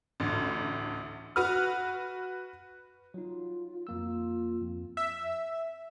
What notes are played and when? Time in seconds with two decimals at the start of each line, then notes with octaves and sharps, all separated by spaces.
0.20 A1 D2
1.36 F#4 B4 F6
3.14 F#3 D#4 F4
3.87 F2 A#3 E6
4.04 F4
4.62 F2
4.97 E5